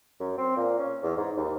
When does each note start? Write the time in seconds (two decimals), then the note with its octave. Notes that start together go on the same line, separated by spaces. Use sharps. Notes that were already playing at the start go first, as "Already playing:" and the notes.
0.20 F#2
0.38 C4
0.57 A#2
0.79 C#4
1.03 E2
1.17 G#2
1.37 D#2